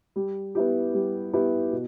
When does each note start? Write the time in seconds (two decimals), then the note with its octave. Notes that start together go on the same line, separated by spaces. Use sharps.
0.16 G3
0.55 B3 E4 G4
0.94 G3
1.33 B3 E4 G4
1.72 B2